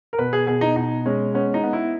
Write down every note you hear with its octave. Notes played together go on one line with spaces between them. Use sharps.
A#4
B2 B4
G#4
B2 G#4
D#4
B2 D#4
G#3 C#4
B3 C#4
D#4
B3
E4